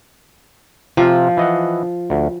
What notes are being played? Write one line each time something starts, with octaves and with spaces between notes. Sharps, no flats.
C3 F3 F4
E3 D#5 F#5
D2